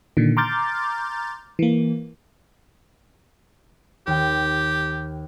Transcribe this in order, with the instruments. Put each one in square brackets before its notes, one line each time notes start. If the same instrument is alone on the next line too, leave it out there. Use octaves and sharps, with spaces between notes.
[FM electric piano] A#2 D3 D#3
A#5 C6 D6 F6 G6 A6
E3 A#3
[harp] D#2 G5 [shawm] G4